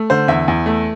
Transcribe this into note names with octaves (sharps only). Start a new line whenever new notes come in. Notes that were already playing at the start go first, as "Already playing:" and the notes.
Already playing: A3
D3 C5
E2 E5
E2
A3